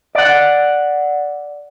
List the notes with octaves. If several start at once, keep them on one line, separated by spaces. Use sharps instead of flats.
D5 F#5